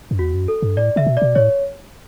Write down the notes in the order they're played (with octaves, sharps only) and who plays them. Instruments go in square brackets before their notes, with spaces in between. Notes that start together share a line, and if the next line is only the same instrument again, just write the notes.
[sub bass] F#2
[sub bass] E2 [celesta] F#4
[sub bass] F#2
[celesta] A4
[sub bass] G2
[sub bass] A2 [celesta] D5
[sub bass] C#3 [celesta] E5
[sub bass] B2
[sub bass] B2 [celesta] D5
[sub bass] A2 [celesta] C#5